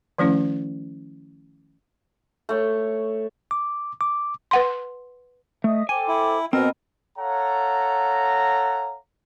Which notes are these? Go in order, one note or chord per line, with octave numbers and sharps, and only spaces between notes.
D#3 F3 A3 C#4 E4
A3 C#5
D6
D6
B4 F#5 C6
A3 D#5 E5 D#6
A4 C5 G5 G#5 D6
E4
B2 B3 C4 F#4 A#4 C5 D#5
A4 C#5 F5 F#5 A#5